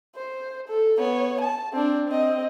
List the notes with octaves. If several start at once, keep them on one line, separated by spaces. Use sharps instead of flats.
C5
A4
B3 C#5
A5
C4 D4
C4 D#5